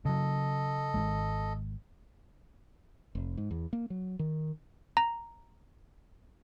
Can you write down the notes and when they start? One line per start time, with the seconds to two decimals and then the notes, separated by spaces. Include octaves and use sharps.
0.05 C#3 F#3 A4 D#5
0.94 G#1 E2 G#3
3.15 F1
3.37 G#2
3.51 E2
3.73 A#3
3.90 F#3
4.19 D#3
4.97 A#5